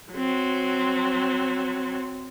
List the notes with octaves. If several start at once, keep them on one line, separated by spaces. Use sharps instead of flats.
F#3 C4